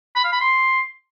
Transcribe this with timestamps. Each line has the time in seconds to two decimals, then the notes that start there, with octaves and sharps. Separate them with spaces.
0.16 B5
0.24 F5
0.32 B5
0.41 C6